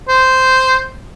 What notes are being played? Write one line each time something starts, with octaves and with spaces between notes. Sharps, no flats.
C5